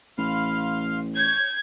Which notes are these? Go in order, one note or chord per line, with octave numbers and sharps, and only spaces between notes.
A1 F5 B5 C6 F6
C#5 G6 G#6